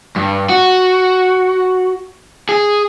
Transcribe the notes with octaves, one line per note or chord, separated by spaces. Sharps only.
G2
F#4
G#4